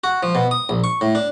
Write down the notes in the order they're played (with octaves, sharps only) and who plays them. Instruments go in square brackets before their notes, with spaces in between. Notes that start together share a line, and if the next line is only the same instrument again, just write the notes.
[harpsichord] F#4
F3
B2
D#6
A#1
C#6
A2
D4